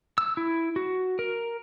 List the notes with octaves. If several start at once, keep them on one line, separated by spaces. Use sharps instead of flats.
E6
E4
F#4
A#4